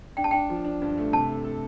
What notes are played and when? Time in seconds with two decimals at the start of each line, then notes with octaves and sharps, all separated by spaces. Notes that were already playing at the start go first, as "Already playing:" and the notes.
0.17 D4 G5
0.24 A5
0.31 D4 G5
0.50 F3
0.65 D4
0.82 G2
0.98 A3
1.12 C3 A5
1.29 A4
1.44 A4